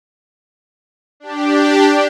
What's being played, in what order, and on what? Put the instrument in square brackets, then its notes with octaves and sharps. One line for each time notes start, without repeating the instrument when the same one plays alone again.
[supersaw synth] D4 G4